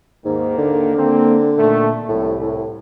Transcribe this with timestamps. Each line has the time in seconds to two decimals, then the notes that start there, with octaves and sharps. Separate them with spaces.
0.25 D#2 G#2 D#3 A#3
0.58 D3
0.96 A#3 C4
1.57 A#2 D#3 A3
2.09 C2 A2
2.42 A2